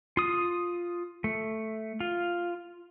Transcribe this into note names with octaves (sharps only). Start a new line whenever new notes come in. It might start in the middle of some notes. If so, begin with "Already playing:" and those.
F4 D#6
A3
F4